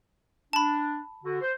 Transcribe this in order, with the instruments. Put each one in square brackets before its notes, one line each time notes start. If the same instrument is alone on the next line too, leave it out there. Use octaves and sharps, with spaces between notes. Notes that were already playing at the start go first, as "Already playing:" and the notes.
[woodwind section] D4 [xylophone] A5 B5
[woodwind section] D3 F#4
C5